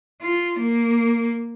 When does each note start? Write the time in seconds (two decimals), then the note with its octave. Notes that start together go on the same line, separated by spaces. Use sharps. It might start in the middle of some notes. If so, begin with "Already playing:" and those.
0.22 F4
0.59 A#3